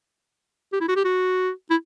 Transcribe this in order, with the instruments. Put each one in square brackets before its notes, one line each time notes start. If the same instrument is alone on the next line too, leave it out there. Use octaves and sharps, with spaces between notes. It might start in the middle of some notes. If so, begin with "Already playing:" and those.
[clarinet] G4
E4
F#4
G4
F#4
E4